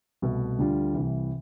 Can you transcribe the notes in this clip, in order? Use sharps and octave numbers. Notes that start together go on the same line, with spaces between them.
C2 B2 A3
D2 D3 G3 D4 F4
C2 C3 E3